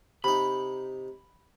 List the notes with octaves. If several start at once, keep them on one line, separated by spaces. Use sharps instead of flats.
C3 D#4 B5